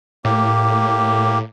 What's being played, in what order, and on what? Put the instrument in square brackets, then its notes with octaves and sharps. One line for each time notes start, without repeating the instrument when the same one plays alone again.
[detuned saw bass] A2 [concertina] A#3 G4